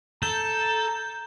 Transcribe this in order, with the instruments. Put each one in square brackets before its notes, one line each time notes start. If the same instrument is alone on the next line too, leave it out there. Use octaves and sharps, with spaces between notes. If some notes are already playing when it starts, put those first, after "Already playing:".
[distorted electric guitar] A4 [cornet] A#5 [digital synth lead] G6